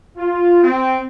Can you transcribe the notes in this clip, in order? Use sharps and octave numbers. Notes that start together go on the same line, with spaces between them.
F4
C4